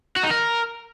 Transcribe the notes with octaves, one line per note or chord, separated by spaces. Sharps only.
F#4
D#4
A#4